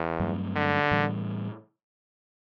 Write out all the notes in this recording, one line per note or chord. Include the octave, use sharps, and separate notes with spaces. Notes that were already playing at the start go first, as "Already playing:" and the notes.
Already playing: E2
G2 F#3 A3 C4
D3
A2 E3 G3